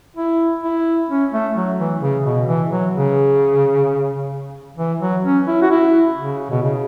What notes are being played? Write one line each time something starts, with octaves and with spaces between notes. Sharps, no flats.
E4
E4
C#4
A3
F#3
E3
C#3
B2
E3
F#3
C#3
E3
F#3
C#4
E4
F#4
E4
C#3
B2
C#3